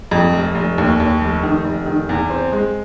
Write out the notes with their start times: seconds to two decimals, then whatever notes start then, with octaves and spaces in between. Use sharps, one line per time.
0.11 F2
0.33 F1
0.55 F1
0.78 D#2
1.00 D#2
1.21 F1
1.43 D#3
1.65 F1
1.86 D#3
2.09 E2
2.30 C4
2.52 G#3